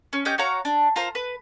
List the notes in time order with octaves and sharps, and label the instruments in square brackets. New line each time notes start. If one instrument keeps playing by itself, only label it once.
[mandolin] C#4
C#4 G4 D#5 G6
F#4 C#5 F5 A#5
D4
F4 A#4 C5
B4